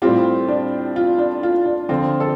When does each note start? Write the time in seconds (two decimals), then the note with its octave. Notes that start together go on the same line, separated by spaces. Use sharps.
0.02 A2 G3 C4 F4 G4
0.48 D4
0.96 F4
1.19 D4
1.43 F4
1.66 D4
1.89 D3 F3 C4 F4
2.20 A4